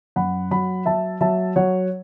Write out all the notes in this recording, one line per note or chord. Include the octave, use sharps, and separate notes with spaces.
F#2 F#5 B5
F#3 F#5 B5
F#3 E5 A5
F#3 E5 A5
F#3 C#5 F#5